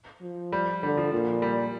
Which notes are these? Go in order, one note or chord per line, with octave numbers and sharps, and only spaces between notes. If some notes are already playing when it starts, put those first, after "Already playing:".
F3
G3
D3 G3
F3
A#2
G3